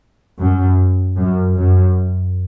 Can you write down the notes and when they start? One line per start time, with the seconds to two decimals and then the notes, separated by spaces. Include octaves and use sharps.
0.40 F#2
1.17 F#2
1.56 F#2